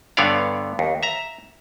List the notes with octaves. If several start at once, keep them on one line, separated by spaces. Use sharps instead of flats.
G2 D3 B3 C#5 D5 F5
D#2
E5 A#5